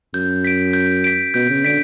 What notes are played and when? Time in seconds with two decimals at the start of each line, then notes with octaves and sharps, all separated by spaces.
0.14 F#2 G6
0.45 B6 D7
0.73 G6
1.04 B6 D7
1.34 B2 G6
1.50 C#3
1.64 D3 B6 D7